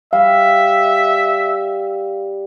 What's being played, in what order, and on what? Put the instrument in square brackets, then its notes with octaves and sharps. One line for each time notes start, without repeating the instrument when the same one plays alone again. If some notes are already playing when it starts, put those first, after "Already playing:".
[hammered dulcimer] G3 [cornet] E5 [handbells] F5